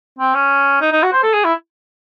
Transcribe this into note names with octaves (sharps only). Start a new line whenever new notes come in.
C4
C#4
D#4
D#4
F#4
C5
A4
G#4
E4